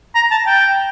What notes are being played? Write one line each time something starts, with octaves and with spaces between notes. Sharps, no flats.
A#5
A5
G5